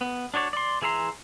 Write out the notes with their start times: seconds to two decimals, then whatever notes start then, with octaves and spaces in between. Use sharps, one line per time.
0.01 B3
0.34 D4 F#4 C#5 D5 A5
0.53 D5 C6
0.82 E3 G#4 E5 A#5 C6